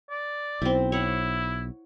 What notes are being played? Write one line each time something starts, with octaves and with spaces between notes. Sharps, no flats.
D5
B1 C4 E4
E4 C#5 F#5